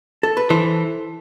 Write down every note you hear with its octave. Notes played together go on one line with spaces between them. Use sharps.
A4
B4
E3 A4 C5